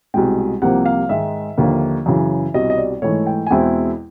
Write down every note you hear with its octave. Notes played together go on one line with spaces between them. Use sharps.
C2 B2 G#3 G5
C2 C3 F3 A#3 F#5
F5
G#2 D#3 G#3 E5
D#2 D3 F3 A#3
F#2 C#3 E3
C2 B2 G3 D#5
D#5
D5
G#2 E3 A3 C#5
G5
G#5
E2 B2 G#3 C4 E4 G5